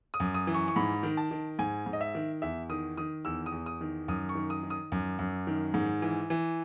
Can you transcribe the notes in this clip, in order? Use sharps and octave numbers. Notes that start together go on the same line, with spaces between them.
D#6
F#2
D#6
E3
C#6
C#6
G#2 B5
D#3
A5
D#3
G#2 G#5
G#2
D#5
E5
D#3
E2 E5
D#3 D#6
D#3 D#6
E2 E6
D#6
E2
D#6
D#3
F#2 D#6
C#6
D#3
D#6
D#3
D#6
F#2
F#2
D#3
G#2
E3
E3